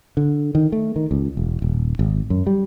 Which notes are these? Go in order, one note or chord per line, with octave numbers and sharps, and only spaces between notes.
D3
D#3
A3
D#3
C#2
E1
D#1
G#1
F#2
G3